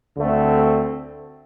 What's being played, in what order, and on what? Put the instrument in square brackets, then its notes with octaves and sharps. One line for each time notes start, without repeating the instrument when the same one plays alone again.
[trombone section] D2 D3 A3 C4